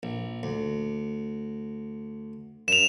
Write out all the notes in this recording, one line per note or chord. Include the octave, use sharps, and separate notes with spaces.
A#1
D2
F#2 E7 F7